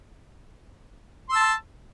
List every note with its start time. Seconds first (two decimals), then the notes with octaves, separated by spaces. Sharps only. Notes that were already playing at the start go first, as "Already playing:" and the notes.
1.29 C6
1.32 E6
1.35 A5